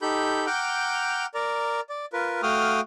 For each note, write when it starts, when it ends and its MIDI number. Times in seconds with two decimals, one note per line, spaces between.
0.02 0.46 63
0.02 0.46 67
0.02 0.46 69
0.02 0.46 83
0.02 0.46 91
0.47 1.26 78
0.47 1.26 79
0.47 1.26 82
0.47 1.26 86
0.47 1.26 89
0.47 1.26 91
1.34 1.81 70
1.34 1.81 74
1.34 1.81 82
1.90 2.06 74
2.13 2.41 65
2.13 2.41 70
2.13 2.41 71
2.43 2.81 57
2.43 2.81 66
2.43 2.81 77
2.43 2.81 79
2.43 2.81 87
2.43 2.81 89